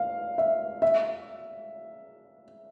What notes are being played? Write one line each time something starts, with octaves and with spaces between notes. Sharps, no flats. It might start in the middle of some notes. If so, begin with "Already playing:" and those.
Already playing: F5
E5
E5